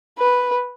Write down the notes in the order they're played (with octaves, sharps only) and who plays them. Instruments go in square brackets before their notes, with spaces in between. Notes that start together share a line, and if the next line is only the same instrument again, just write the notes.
[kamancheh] B4